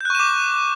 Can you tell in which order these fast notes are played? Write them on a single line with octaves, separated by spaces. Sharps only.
G6 F#6 C#6 E7 D6